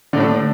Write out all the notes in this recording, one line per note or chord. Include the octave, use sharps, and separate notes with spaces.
A2 D3 A3 D4